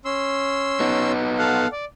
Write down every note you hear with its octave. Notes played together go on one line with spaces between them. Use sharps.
C#4 C6 E6
B3 D#4
A4 F5 F#5
D5